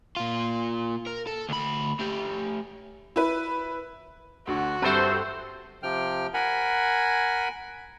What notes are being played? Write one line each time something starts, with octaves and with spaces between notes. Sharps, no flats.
A#2 F4
A#4
A4
D2 B5
A3 G4
E4 B4
D2 D3 F#4
G2 G3 C4 A4 B4 C5 E5
C3 F3 G5 F6
A#4 F#5 G#5 B5